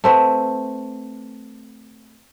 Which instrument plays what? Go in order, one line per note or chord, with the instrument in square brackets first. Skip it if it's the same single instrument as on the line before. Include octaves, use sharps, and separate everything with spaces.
[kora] A3 C4 B4